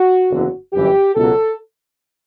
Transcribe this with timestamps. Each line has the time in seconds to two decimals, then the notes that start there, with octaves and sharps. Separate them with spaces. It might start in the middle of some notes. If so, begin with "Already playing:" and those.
Already playing: F#4
0.30 F#1 E2 D3 F#3
0.73 G1 F#2 E3 G4
1.15 C#2 B2 F#3 A4